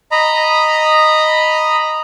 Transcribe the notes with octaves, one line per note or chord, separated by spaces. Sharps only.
D#5 A#5 B5